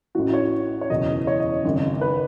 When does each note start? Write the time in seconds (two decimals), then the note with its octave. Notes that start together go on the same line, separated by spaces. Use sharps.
0.15 A1 A2 E3 F#4
0.33 C#5
0.81 C#5
0.90 F#1 E2 B2 D#5
1.27 C#5
1.40 D#5
1.65 G#1 F#2 C#3
2.01 B4